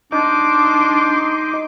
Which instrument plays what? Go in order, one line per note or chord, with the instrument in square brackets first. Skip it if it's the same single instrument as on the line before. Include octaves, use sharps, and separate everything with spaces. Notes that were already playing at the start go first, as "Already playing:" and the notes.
[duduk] D4 [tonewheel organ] D#4 [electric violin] C6 D6